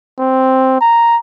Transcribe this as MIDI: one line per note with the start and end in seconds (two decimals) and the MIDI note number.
0.19 0.80 60
0.81 1.17 82